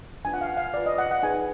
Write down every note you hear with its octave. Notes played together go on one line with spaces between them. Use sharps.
D4 F4 B4 G#5
F#5
F5
F5
F4 B4 D5
D#5
F#5
F#5
D#4 G#4 B4 G#5